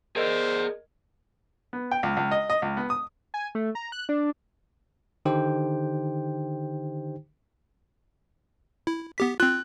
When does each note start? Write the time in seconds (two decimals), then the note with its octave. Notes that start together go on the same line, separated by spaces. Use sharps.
0.16 G#4 A#4 C5 D5 D#5
1.73 B3
1.91 G5
2.03 C#2
2.17 C#2
2.31 D#5
2.50 D#5
2.62 C#2
2.77 B3
2.90 D#6
3.34 G#5
3.55 A3
3.75 A#5
3.92 F#6
4.09 D4
5.25 D3 D#3 D#4 G4 C5 G5
8.87 E4
9.18 B3 G4 B6
9.40 C4 F4 F#6